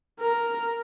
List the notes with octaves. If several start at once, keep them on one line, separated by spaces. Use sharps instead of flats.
A#4